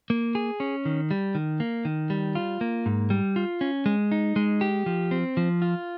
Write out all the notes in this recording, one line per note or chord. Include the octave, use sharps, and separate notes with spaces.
A#3
G#4
C#4
D#3
G3
D#3
A#3
D#3
G3
F4
A#3
G#2
G3
F4
C#4
G#3
D#4
G#3
G4
F3
C4
F3
F4